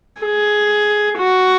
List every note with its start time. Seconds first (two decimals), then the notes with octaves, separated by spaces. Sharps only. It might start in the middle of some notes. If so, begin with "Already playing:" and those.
0.22 G#4
1.18 F#4